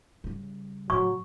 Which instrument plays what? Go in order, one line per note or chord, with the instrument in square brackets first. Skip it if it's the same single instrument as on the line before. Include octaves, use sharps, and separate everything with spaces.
[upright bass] C#3 G3
[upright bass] A2 C#3 [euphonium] F#3 [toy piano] C#6